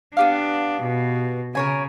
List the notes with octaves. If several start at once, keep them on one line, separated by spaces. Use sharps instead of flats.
B3 D4 G4 F5
B2
C#3 A#4 C#5 G#5